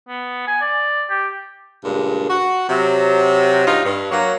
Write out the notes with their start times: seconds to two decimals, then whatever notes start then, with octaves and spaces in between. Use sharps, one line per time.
0.08 B3
0.48 G#5
0.61 D5
1.10 G4
1.84 G2 A#2 C#3 G#3
2.30 F#4
2.68 C3 F#3
3.67 G2 D#4 F4
3.85 G2
4.11 F#3 A#3